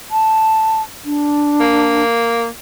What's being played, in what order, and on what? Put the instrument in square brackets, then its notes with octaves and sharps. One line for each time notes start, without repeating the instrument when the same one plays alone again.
[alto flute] A5
D4
[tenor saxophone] A#3